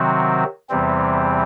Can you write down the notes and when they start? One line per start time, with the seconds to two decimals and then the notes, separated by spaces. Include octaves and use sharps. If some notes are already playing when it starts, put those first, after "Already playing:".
Already playing: C3 D#3 F#3 C4 F#4
0.69 E2 C3 E3 G3 C4